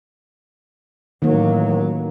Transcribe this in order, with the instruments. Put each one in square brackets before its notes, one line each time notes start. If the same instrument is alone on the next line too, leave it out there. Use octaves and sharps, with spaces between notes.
[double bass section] A1 F#3 [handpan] D#3 A#3